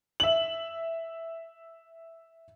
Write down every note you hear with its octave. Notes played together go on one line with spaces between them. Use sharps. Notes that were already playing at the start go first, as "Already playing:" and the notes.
E5 F#7